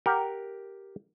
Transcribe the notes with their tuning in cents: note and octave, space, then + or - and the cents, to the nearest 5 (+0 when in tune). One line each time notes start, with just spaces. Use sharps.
G4 +0 A#4 +0 F#5 +0